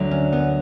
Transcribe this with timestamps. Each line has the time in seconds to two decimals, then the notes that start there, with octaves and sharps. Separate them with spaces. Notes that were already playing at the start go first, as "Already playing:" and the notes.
Already playing: D2 D3 F#3
0.11 C#4
0.33 B3